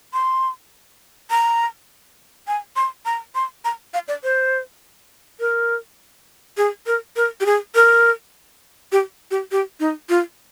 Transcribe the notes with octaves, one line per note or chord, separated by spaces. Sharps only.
C6
A#5
G#5
C6
A#5
C6
A#5
F5
D5
C5
A#4
G#4
A#4
A#4
G4
G#4
A#4
G4
G4
G4
D#4
F4